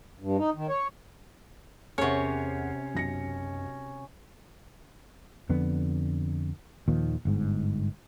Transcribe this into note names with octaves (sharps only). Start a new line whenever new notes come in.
G2
D#4
D#3
C#5
E2 C3 C#4 G#4 A#4 C#5 F#5
B1 F#2 A#6 C#7
F2 D3 B3
D#2 A#2 D#3 F3
G1 G#2